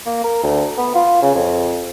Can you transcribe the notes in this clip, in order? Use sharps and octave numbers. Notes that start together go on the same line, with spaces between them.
A#3
A#4
D2
B3
F4
C#3
F2